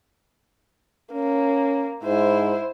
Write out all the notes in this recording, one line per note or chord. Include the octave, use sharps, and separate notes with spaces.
A#3 C#4
G#2 E4 C5